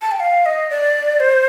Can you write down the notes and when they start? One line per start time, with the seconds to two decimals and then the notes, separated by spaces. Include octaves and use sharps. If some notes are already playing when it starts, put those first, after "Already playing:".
0.02 A5
0.11 G5
0.20 F5
0.46 D#5
0.70 D5
1.20 C5